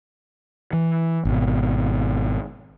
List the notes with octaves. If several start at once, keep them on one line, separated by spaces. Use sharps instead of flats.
E3
G#1 B2